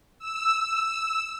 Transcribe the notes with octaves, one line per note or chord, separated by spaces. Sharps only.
E6